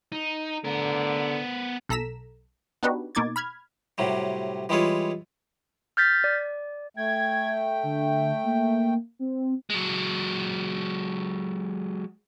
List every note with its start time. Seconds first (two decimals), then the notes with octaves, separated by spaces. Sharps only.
0.12 D#4
0.65 D3 B3 A#4
1.89 B1 A4 A#5 B6 E7
2.83 B3 D4 D#4 F#4 G4 B4
3.15 B2 A#3 D#4 D6 G#6 A6
3.36 B5 F6 G#6
3.98 A2 C3 F#3 G3
4.69 E3 G3 G#3 E4 F4 C#5
5.97 F6 G6 A6 B6
6.24 D5
6.97 A3 G5 G#6
7.83 D3
8.44 A#3
9.19 C4
9.70 F#3 G#3